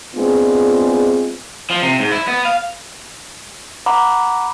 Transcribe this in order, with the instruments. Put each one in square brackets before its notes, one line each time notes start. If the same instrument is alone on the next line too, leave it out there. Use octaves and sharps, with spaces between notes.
[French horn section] G#3 B3 C4 D4 F4 G#4
[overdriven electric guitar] F3
C3
G#2
E4
B3
F5
[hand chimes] F#5 A#5 B5 D6